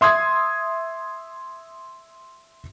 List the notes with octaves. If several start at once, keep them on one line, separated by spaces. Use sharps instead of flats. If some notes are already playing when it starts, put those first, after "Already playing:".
E5 C6 D#6 G#6